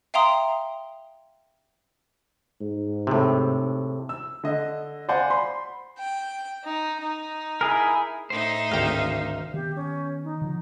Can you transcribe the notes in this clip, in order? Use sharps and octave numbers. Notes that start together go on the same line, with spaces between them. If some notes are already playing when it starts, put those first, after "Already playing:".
E5 F5 G5 A#5 C6 D#6
G#2
A2 C3
E6
D3 D#5
C5 D5 F5 F#5 G#5
B5 C6
G5
D#4
D#4
E4 G#4 A#4
A2 D#4 C5 E5
G#1 D2 F5 G5
D#3 B3 G4
C#4
D#4
D3 F3